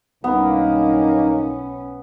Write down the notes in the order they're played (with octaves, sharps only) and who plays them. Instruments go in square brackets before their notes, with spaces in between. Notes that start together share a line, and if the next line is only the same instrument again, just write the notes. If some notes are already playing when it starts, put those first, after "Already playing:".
[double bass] B1 C#4 [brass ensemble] G2 D#3 A#3 [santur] B3 [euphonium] D#4